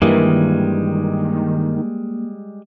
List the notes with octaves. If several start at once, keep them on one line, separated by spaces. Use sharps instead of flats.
G2 D#3 E3 G3 G#3 A#3